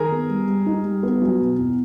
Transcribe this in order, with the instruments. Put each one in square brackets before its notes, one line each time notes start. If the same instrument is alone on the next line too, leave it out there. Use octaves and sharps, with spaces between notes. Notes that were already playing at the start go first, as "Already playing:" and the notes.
Already playing: [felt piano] D#3 [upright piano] G#4 A#4
[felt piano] B3
G3
G3
D#4
G3
B3
F#3
B2
E2